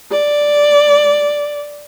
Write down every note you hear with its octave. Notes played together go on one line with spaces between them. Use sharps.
D5